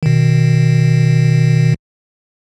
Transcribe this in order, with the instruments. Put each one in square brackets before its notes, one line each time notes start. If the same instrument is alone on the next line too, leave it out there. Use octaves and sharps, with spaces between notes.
[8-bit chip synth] B2 D#3